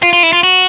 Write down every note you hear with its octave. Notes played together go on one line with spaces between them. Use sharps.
F4
F4
E4
F4
F#4